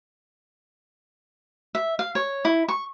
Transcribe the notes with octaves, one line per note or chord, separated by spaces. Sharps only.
E5
F5
C#5
E4
C#6